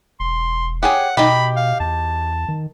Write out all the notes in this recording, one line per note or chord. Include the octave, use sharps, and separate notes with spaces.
E1 C6
G4 G#4 C#5 F#5
B2 D#4 G4 B5
F5
E2 A5
D#3